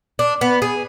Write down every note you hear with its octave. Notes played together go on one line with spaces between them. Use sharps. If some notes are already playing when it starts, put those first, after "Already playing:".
D4
B3
G#4